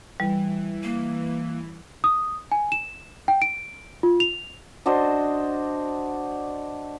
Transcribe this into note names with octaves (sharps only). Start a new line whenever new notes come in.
E3 G3
A#3
D#6
G#5
E7
G5
D7
F4
F7
D4 F#4 C5 D#5